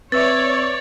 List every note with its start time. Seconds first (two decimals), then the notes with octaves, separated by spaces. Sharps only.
0.12 C4 B4 C#5 D5 E5 E6 A6